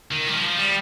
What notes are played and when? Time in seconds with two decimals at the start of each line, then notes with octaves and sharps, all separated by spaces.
0.12 D#3
0.29 G3
0.36 F3
0.59 G3